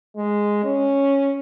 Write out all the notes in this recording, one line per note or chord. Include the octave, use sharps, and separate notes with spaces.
G#3
C#4